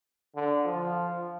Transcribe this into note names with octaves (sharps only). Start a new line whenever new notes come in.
D3
F3